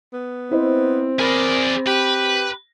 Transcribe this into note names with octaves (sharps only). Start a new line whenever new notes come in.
B3
C4 E4 C5 D#5
G#4 A#4 D5 B5 A#6
G4 B4